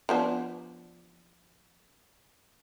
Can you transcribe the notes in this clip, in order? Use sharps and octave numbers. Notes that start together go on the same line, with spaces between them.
F3 B3 D4